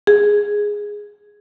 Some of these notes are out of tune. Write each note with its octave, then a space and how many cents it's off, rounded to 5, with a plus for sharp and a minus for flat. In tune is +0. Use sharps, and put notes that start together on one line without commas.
G#4 -5